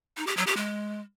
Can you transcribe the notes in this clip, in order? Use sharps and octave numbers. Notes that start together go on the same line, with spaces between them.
D#4
G4
F#3
G4
G#3